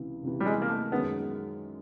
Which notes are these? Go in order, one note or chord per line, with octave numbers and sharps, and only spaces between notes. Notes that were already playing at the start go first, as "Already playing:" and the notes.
Already playing: C#2 C3 E3
C#2 C3 E3
G3
G#3
A#3
A3
F#2 D#3 G#3 B3